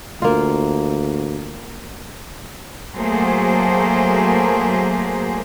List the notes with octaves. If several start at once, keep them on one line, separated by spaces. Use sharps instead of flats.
D2 A#3 F4
F#3 A3 A#3 G#4 C5